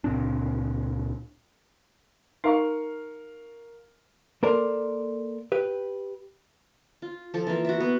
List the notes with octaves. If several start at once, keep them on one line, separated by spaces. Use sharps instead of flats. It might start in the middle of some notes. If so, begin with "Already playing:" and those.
C#2 A#2 C4 D4
D#4 A#4 F5 C#6
A#3 A4 A#4 C5 D5
G4 B4
F4
F3 A4
E3 A#3 F4
F#4 E5
B3